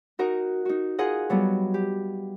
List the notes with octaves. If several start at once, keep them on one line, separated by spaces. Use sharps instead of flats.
D#4 F#4 A#4 D#5
D#4 F#4
F4 G#4 A#4 D#5 F#5
F#3 G3 B3
G4